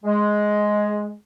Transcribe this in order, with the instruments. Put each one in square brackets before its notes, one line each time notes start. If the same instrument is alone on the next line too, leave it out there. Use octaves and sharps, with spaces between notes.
[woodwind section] G#3